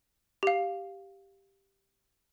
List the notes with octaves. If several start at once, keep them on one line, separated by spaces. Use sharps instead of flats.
G4 F5